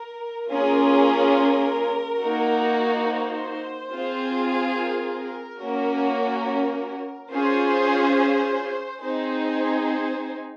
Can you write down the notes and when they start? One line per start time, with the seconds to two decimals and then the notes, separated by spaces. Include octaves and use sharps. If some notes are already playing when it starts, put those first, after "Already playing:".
Already playing: A#4
0.51 A#3 C#4 F4 G#4 A#4
2.21 A#3 D#4 F#4
3.06 C5
3.90 C4 F4 G#4
4.76 A#4
5.61 A#3 C#4 F#4
7.31 C#4 F4 G#4 C5
9.01 C4 D#4 G#4 C5
9.87 C5